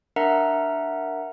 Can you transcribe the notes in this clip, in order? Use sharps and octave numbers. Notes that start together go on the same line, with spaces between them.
D4 A#4 E5 F#5 A#5